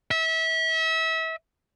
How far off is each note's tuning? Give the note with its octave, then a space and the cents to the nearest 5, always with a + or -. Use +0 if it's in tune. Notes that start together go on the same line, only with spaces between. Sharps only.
E5 -30